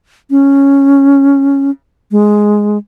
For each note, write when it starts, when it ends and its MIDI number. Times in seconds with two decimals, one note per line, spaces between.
0.31 1.71 61
2.11 2.78 56